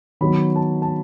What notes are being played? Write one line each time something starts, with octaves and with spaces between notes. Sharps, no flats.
D#3 F#3 B3 B5
A5
A5